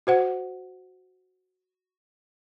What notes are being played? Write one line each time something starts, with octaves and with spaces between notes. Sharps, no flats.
F#4 C5 F#5